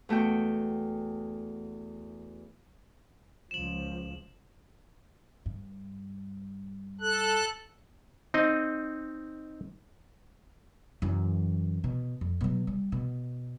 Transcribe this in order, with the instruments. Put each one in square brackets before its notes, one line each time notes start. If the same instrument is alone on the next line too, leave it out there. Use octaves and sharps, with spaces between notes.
[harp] E2 A3 F#4 G5
[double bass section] C#2 F3 [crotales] E7 F#7
[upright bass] G2
[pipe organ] A4 F#6
[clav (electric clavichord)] C4 D#4 D#5
[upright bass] F#2 E3
B2
F2
B2 F#3
G3
B2